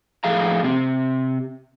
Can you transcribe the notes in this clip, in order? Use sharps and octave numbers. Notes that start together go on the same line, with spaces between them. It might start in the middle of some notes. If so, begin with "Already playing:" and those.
A2 F3 A3 G#4 F5 A#5
C3 C4